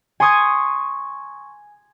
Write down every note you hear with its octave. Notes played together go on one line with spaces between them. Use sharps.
G#5 C6 C#6 D#6 G#6